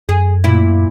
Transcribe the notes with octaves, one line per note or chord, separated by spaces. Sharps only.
F#2 G#4
A#2 E4